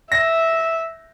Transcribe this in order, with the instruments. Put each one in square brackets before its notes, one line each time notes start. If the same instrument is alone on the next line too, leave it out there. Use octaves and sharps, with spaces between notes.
[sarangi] E5 [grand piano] A#6